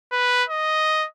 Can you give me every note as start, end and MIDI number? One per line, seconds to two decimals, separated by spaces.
0.12 0.44 71
0.49 1.06 75